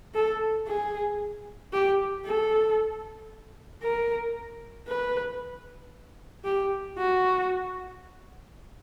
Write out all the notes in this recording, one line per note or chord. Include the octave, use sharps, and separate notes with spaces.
A4
G#4
G4
A4
A#4
B4
G4
F#4